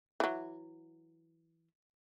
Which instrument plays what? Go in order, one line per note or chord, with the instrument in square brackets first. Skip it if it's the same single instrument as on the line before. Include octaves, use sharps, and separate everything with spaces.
[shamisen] E3 F#3